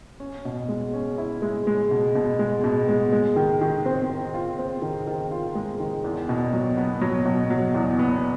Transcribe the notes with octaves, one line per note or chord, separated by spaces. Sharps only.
C#4
B2
G#3
C#4
E4
G#3
G#3
B2
B2
G#3
B2
G#3
G#3
D#3
D#3
C4
D#3
F4
C4
D#3
D#3
F4
G#3
D#3
E2
B2
F#3
B3
F#3
B2
F#3
E2
B3